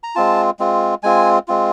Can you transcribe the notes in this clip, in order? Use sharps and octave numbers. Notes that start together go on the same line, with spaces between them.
A#5
G#3 C4 F4 A5
G#3 C4 F4
G#3 C4 F4 G#5
G#3 C4 F4